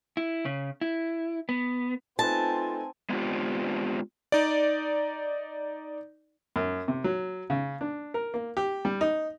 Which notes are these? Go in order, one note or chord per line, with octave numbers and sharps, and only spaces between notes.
E4
C#3
E4
B3
A3 C4 D#4 F4 B4 G#5 A5
G#3 B3 C4 D4 F4 G4
D#4 D5
F#2
C3
F#3
C#3
D4
A#4
A#3
G4
G3
D#4